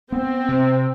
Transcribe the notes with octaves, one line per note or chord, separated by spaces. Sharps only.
B3 C4
C3